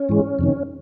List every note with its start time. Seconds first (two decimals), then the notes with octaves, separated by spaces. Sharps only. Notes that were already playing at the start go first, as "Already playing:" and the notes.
Already playing: C#4
0.09 G#2 E3 G#3
0.39 F2 C3 D#3